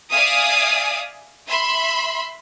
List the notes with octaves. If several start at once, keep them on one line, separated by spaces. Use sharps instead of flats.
D5 E5 F5 G#5 D#6
E5 B5 C6